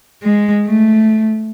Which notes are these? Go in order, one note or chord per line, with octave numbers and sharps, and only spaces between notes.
G#3
A3